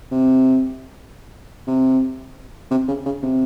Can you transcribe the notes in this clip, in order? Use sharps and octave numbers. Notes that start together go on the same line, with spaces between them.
C3
C3
C3
C#3
C#3
C3